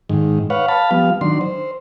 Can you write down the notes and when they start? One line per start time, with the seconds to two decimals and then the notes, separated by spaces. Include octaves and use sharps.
0.09 G#2 D#3
0.50 B4 C#5 F5 F#5
0.69 F5 A5 B5
0.91 F3 G3 B3 F5
1.21 D#3 F#3 D4 C6
1.41 C5